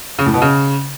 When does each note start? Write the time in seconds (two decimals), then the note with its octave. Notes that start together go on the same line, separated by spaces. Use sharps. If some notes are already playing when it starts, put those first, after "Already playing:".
0.19 C#3
0.26 A2
0.34 B2
0.42 C#3